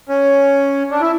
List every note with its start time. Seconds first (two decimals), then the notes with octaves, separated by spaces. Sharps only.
0.09 C#4
0.91 D4
1.01 E4